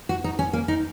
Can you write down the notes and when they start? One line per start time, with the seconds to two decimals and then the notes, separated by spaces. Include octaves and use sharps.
0.09 F#4
0.24 D#4
0.39 C#4
0.53 A#3
0.68 D#4